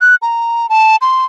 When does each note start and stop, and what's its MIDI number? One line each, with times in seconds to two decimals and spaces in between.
0.01 0.15 90
0.22 0.69 82
0.69 0.96 81
1.01 1.25 84